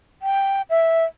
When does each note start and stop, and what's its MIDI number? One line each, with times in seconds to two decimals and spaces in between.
0.22 0.62 79
0.70 1.04 76